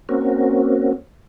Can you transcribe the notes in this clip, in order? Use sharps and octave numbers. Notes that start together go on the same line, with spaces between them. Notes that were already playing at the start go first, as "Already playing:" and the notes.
A#3 C4 C#4 F#4